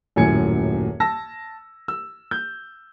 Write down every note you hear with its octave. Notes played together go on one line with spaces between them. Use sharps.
D#1 F#2 A2 G#5 G#6 C#7
A5 E6 A#6
E6
G6